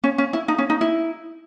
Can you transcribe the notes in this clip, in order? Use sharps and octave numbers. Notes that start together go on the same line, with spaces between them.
C#4
C#4
E4
D#4
C#4
D#4
E4